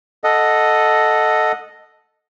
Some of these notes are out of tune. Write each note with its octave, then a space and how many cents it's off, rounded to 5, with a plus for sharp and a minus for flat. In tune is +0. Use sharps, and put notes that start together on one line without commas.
A4 +0 D#5 +0 F#5 -20